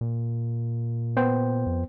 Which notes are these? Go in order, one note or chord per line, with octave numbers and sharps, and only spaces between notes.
A#2
B3 C5 G5
F2